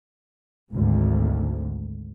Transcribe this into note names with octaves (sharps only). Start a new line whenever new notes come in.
G#1 D2 G#2